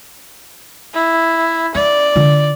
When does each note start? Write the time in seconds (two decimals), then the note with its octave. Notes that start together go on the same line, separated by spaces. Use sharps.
0.94 E4
1.75 C#4 D5
2.16 D3 F4